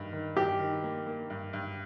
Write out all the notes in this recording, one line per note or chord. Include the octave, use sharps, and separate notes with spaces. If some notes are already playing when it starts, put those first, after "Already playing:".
Already playing: G2 D#3
D#3
G2 G4
D#3
A#3
A#3
G2
G2